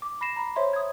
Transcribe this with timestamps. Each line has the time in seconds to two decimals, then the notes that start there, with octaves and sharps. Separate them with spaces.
0.02 D6
0.21 B5 A#6 C7 E7
0.36 A#5 B5
0.56 C5 C#5 E5 C6
0.73 D#6 G#6